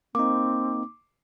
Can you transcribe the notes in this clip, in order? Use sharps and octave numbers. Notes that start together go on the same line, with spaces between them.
A#3 C4 D#4 D6